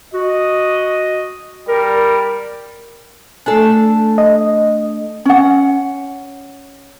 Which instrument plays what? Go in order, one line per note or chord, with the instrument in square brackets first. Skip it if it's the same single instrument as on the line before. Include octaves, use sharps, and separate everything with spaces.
[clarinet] F#4 [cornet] D#5
[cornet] G3 [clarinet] A#4
[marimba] A3 G#5 [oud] D4 A4
[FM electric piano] D#5
[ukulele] C#4 F#5